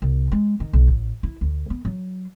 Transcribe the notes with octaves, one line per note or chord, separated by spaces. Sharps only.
C2
G#3
D#3
B1
A1
E4
D2
B3
F#3